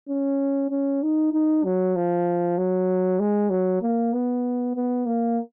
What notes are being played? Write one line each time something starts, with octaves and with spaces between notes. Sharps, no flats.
C#4
C#4
D#4
D#4
F#3
F3
F#3
G#3
F#3
A#3
B3
B3
A#3